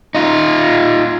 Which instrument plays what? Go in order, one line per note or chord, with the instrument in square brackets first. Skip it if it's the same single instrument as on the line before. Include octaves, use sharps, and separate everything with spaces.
[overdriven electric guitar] D#4 F4